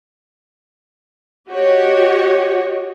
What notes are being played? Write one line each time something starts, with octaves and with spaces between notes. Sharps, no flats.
F#4 G4 C#5 D#5